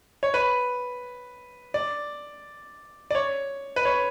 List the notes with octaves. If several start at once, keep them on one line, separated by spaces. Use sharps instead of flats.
C#5
B4
D5
D5
C#5
B4
C#5